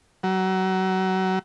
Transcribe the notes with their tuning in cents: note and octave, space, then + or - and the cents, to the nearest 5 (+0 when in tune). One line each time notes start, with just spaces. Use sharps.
F#3 +30